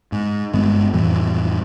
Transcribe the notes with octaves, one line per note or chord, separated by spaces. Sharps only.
G#2
G1 G2 G#3 B3
F2 A2 E3 G3